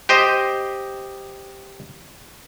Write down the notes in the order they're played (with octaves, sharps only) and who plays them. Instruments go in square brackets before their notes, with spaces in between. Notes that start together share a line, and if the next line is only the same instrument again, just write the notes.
[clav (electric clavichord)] G4 C5 D#5